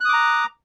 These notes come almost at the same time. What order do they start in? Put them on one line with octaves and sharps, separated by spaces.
F#6 D#6 D6 A#5